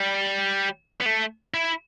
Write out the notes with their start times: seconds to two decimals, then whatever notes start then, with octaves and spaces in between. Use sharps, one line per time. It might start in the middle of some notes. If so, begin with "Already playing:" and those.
Already playing: G3
1.01 B3
1.06 A3
1.54 E4